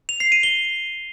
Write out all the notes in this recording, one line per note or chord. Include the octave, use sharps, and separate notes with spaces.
F7
C7
D#7
G7